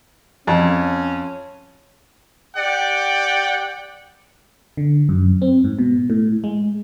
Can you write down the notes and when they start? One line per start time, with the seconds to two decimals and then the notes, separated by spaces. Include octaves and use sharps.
0.47 F2 C#4
2.56 G4 D5 F#5 G5
4.77 D3
5.09 F#2
5.42 C4
5.64 G#2
5.79 B2
6.10 A2
6.44 G#3